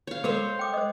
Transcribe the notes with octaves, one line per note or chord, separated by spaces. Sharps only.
C#5 F5
G#3 A4 A#4 C5 C#5 F5
G5 D6 D#6
C5 D#5